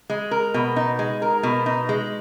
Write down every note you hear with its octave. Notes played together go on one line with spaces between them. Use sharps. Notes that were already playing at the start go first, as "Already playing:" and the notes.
G#3
A#4
B2
D#4
G#3
A#4
B2
D#4
G#3